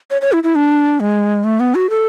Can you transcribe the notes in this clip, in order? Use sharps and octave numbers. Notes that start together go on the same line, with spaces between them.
C#5
C#5
E4
E4
D4
G#3
A3
B3
F#4
A4